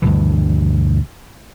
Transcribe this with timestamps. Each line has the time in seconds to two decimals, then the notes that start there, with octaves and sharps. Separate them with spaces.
0.02 D2 G2 B2 E3